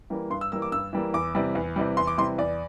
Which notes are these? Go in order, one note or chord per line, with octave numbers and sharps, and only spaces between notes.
E3 G3 A#3
G2 C6
E6
E3 G3 A#3 E6
D6
G2 E6
E3 G3 A#3
E2 D6
C3 E3 G3
E2
C3 E3 G3
E2 C6
D6
C3 E3 G3 C6
E2 D5